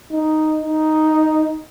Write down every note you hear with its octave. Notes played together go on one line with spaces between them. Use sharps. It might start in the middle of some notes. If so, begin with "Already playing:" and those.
D#4
D#4